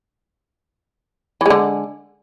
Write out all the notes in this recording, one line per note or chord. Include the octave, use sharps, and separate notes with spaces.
D3 E3 G#3